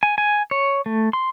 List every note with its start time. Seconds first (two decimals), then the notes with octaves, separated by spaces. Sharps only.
0.03 G#5
0.18 G#5
0.51 C#5
0.86 A3
1.13 C6